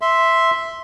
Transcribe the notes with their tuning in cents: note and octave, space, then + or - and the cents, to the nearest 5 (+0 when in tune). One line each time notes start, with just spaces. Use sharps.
E5 +0 C6 +0